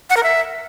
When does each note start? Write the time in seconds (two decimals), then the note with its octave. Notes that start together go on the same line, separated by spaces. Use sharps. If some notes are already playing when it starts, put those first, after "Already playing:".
0.10 F#5
0.17 A#4
0.23 E5